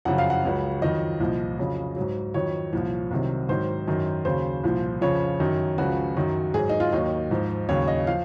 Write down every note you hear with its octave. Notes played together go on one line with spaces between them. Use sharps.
F#2 C#3 F3 F#5
F5
F#5
C#2 C#3 F#3
F2 D#3 F#3 D#5
C2 A#2 F3
F2 C#3 F#3
G#2 F#3
F2 D#3 F#3 C#5
C2 A#2 F3
C2 C3 D#3 F#3
G#2 D#3 F#3 C5
F#2 D#3 F#3
D#2 C#3 F#3 C5
C2 A#2 F3
F2 C#3 F3 C#5
F#2 D#3 F#3
C#2 C#3 F3 F#4
F#2 D#3 F#3
G#2 F#3 G#4
D#4
F4
D#2 D#3 F#3 D#4
G#2 F3
D#2 C#3 F#3 C#5
D#5
F3 F5